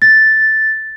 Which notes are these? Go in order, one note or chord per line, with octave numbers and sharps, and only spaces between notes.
A6